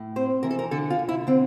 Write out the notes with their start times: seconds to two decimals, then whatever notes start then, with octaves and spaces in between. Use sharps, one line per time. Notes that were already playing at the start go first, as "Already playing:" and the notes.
Already playing: A2
0.16 C4 C5
0.43 E3 A#4
0.51 A4
0.59 A#4
0.71 D3 A4
0.90 F4
0.99 D3
1.09 E4
1.27 D3 C4